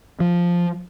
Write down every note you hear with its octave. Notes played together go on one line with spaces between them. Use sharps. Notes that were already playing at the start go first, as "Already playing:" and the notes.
F3